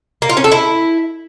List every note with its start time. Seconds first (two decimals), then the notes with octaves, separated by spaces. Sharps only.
0.22 A#3
0.29 F4
0.37 C#4
0.44 A4
0.51 E4